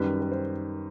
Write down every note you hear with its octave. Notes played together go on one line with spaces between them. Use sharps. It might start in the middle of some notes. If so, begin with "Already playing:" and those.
Already playing: F#2 D#3 G3 B4
B4
C5